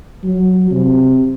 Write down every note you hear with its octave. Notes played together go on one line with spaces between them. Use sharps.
F#3
C3